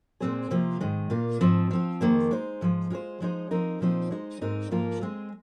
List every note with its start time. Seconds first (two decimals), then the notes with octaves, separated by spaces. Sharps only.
0.20 A#2 G#3 C4 G#4 C5
0.50 C3 F3 A#3 F4 C5
0.81 G#2 D#3 G#3
1.10 A#2 A#3 F4
1.41 G#2 F3 C4
1.71 F3 C4 F4
2.01 F2 D#3 A#3 G#4 C5
2.31 G#3 D#4 C5
2.61 G#2 F3 G#3
2.90 G#3 F4 G#4 C5
3.20 F3 G#3 D#4 G#4 C5
3.51 F3 C4 D#4 A#4
3.81 A#2 F3 C4 D#4 C5
4.11 G#3 D#4 C5
4.41 G#2 G#3 C4 D#4 A#4
4.71 G#2 F3 A#3 F4 A#4
5.01 G#3 C4 G#4